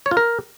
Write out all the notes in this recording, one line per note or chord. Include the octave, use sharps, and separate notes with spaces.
C#5
F4
A#4